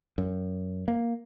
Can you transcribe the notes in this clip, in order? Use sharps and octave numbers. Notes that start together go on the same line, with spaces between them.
F#2
A#3